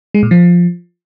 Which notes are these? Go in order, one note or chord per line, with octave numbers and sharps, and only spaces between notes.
G#3
A#2
F3